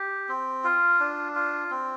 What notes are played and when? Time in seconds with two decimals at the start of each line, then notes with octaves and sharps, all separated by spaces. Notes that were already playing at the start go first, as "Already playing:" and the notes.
Already playing: G4
0.29 C4
0.64 F4
1.00 D4
1.35 F4
1.71 C4